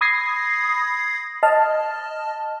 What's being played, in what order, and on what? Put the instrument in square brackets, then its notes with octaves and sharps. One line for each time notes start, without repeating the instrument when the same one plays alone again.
[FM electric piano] B5 D#6 G#6 A#6 C7
D#5 A5 F6